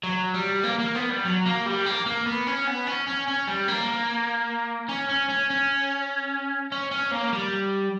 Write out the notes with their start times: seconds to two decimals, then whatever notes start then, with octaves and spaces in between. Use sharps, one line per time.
0.03 F#3
0.34 G3
0.63 A#3
0.79 A#3
0.95 B3
1.10 G3
1.25 F#3
1.45 A#3
1.66 G3
1.86 A#3
2.06 A#3
2.26 B3
2.47 C#4
2.67 B3
2.87 C#4
3.07 C#4
3.27 C#4
3.47 G3
3.68 A#3
4.89 C#4
5.10 C#4
5.30 C#4
5.50 C#4
6.72 C#4
6.91 C#4
7.12 A#3
7.33 G3